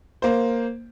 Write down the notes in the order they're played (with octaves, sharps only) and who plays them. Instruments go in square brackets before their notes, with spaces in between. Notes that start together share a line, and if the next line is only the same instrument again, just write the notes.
[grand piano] A#3 C5